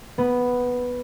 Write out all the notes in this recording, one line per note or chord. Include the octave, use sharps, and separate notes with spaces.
B3